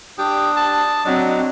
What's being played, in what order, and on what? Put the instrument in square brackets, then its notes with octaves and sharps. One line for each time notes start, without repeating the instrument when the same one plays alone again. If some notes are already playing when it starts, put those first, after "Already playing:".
[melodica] D4 [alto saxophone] G4 [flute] D#6
[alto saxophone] A5
[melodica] F#3 [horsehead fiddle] C4 [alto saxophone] D4 [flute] D#5